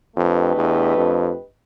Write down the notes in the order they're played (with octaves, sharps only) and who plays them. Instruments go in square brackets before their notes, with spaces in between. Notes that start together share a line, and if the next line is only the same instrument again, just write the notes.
[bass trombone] F2 [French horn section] A3 D4 G4 B4 D#5
[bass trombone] E2
F2